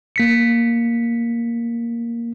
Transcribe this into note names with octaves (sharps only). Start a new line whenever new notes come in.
A#3 B6 C#7